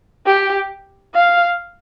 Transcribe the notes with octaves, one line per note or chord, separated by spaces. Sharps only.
G4
F5